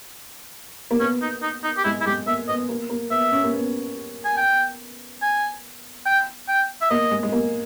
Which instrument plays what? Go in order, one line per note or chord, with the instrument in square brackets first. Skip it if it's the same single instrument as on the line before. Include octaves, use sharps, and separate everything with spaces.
[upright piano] A#3
[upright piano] B3 [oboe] C#4
[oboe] D#4
D#4
D#4
G4
[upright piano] G#3 [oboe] E4
[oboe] E4
[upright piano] G#3 [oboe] G4
[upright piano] A#3 [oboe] E5
[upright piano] B3 [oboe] D#5
[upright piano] A#3
A#3
[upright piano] B3 [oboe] E5
[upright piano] C#4
A#3
B3
[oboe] G#5
G5
G#5
G5
G5
E5
[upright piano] A#3 [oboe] D#5
[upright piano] G#3
G#3
A#3